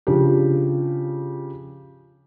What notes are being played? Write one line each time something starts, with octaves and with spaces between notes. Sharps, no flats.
C#3 F3 D4 G4